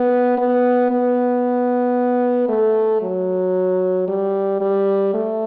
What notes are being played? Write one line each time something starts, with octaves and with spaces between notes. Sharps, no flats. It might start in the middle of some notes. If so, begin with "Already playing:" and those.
Already playing: B3
B3
B3
A3
F#3
G3
G3
A3